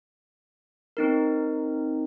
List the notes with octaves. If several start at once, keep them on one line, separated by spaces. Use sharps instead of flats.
C4 D#4 A#4